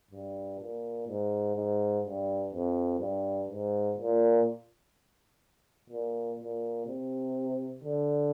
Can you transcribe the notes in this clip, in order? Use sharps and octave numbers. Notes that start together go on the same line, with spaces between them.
G2
A#2
G#2
G#2
G2
F2
G2
G#2
A#2
A#2
A#2
C3
D3